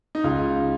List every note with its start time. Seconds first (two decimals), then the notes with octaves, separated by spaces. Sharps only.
0.15 D#4
0.24 C#2 F4